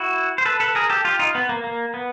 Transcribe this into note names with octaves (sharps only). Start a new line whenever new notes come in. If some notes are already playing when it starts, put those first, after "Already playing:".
Already playing: E4 F#4
C5
A4 B4
A4 B4
G#4 A#4
G4 A4
F4 G4
D#4 F4
B3
A#3
A#3
B3